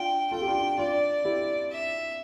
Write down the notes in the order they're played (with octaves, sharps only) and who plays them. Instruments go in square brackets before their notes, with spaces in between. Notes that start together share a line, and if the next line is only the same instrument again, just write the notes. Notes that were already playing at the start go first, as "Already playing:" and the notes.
Already playing: [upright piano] D4 F4 [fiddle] G5
[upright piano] F4 A4 [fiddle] G5
[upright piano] G4
D4 F4
[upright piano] D4 F4 [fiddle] D5
[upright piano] E4 G4
[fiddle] E5